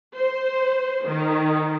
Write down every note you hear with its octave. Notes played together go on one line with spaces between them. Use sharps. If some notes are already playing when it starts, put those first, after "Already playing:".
C5
D#3